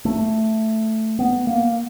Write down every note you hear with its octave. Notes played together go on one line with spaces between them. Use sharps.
A3
B3
A#3